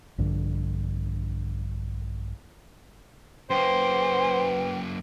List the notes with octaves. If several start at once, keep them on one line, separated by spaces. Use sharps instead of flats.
A#1 G2 D3
F#2 A#3 B4 C5 G5